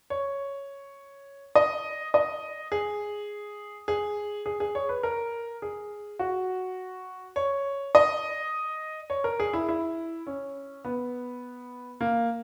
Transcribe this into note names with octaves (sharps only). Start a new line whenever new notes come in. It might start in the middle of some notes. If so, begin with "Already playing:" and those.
C#5
D#5
D#5
G#4
G#4
G#4
G#4
C#5
B4
A#4
G#4
F#4
C#5
D#5
C#5
A#4
G#4
E4
E4
C#4
B3
A#3